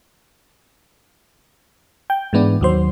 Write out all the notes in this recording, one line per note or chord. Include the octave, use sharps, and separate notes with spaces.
G5
G#2 E3 B3 D4
D#2 F#3 C5